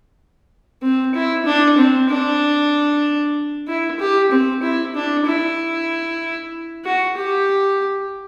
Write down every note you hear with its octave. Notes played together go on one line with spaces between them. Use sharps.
C4
E4
D4
C4
D4
E4
G4
C4
E4
D4
E4
F#4
G4